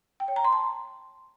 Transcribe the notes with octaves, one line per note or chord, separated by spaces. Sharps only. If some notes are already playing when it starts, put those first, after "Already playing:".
G5
C#5
A#5
C6
A5